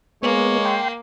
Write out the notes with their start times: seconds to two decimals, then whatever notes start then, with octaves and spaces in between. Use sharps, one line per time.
0.23 G#3 A#3 B3 C#5
0.65 G5 C6